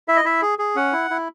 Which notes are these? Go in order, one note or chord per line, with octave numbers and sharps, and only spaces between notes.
E4 E5
D#5
E4 E5
G#4
G#4
C#4 F#5
E4
E4